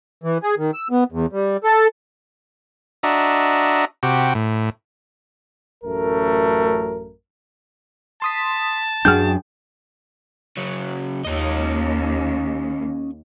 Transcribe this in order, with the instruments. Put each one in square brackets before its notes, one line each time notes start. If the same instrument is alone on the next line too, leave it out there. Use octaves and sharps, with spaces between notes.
[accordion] E3
G#4
D#3
E6
B3
E2
G3
A4
[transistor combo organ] D4 F#4 D#5 E5 A#5
C3 F#4 G4
A2
[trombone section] A1 F#2 A3 A#4
[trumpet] A5 [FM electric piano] C6 D#6 B6
[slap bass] F#2 F#3 D4 [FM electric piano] F#4 G#4 G5 [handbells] F6 G6
[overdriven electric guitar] C#3 F#3
[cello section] D#2 [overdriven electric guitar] C#4 D#5